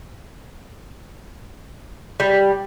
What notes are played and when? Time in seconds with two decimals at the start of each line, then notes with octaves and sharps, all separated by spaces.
2.20 G3